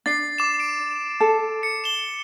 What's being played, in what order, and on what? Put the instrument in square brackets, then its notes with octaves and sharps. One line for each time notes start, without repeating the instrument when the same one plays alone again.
[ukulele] D4 [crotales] A6 C7
[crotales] D6 E7
D7
[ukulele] A4
[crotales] C#7
E7 G7